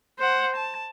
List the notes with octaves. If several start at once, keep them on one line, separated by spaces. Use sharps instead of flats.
C5 F#5
A5